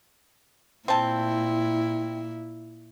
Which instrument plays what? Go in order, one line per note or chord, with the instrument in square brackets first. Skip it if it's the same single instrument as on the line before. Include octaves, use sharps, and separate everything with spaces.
[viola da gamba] A#2 E4 [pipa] C4 A5